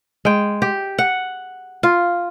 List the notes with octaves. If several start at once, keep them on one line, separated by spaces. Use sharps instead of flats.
G#3 G5
G4
F#5
F4